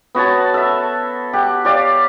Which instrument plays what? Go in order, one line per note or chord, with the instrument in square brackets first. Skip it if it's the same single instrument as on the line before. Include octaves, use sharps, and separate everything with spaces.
[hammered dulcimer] B3 F#4 C#5 A5
A4 E5
G4 F#5
G4 C#5 D5 F5